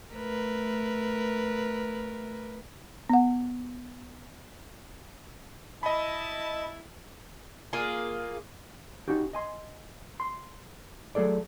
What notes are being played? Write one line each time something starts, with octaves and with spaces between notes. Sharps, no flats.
A3 A#4 B4
B3 F#5
E4 D#5 A5 B5
A#3 F4 G#4
C#4 D#4 F#4 G4
D#5 G#5 C6
C6
F#3 A3 G#4 A4 D5